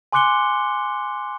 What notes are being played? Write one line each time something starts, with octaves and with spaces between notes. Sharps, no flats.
G#5 C6 D6 F#6 C#7 G7